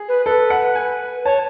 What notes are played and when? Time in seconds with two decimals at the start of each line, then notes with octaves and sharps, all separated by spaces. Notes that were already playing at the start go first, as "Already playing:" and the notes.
Already playing: G#4
0.09 B4
0.26 A4 B4
0.50 F#5
0.76 G#5
1.25 C#5 A5